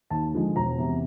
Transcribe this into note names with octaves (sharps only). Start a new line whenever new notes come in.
D#2 A5
D3 F3 G#3
E1 A#5
E2 C3